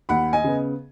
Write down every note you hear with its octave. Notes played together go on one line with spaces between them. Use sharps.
D#2 F#5 B5
D#5 G#5
C#3 B3